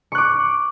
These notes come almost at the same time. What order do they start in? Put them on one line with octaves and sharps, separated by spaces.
C#6 F#6 D6